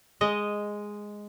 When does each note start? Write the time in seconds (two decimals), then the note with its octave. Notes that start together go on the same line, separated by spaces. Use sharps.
0.21 G#3 D#5